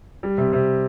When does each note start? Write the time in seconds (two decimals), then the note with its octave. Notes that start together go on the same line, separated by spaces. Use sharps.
0.23 G3
0.38 C3
0.53 C3